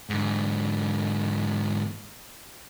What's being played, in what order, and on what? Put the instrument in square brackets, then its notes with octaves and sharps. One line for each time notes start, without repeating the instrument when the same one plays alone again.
[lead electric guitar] G#2 D3